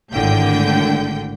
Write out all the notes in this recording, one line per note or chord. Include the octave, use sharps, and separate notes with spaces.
G#1 A2 D3 G5 G6